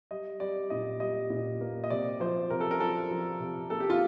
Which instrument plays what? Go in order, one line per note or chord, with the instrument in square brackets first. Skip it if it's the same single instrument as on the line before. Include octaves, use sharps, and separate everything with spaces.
[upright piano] G3 D#5
G3 D5
A#2 D#5
G3 D#5
A#2
A#3
D#5
C3 D5
F3 C5
C3 A#4
A4
A#4
F3 A4
F3
C3
A#3 A4
G4
F4